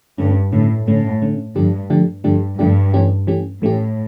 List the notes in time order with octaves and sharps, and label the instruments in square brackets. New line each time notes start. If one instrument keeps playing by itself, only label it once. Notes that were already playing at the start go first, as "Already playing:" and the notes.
[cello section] G2 [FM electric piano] D3 A3 C#4
[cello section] A2 [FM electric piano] D3 A3 C#4
[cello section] A2 [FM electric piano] D3 A3 C#4
[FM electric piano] D3 A3 C#4
[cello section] G2 [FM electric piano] D3 F3 A3 D4 G4
[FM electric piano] D3 F3 A3 D4 G4
[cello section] G2 [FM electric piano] D3 F3 A3 D4 G4
[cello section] G2 [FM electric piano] D3 F3 A3 D4 G4
[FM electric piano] E3 A3 C#4 G4
E3 A3 C#4 G4
[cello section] A2 [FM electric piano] E3 A3 C#4 G4